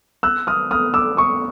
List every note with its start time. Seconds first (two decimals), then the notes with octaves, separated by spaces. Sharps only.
0.23 E6 F#6
0.47 D#6 F6
0.71 D#6 F6
0.94 D6 E6
1.17 C#6 D#6